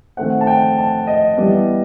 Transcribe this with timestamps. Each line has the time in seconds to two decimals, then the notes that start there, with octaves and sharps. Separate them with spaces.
0.17 D#3 A3 C4 F#5
0.41 A5
0.47 G5
0.78 A5
1.07 D#5
1.37 E3 G3 B3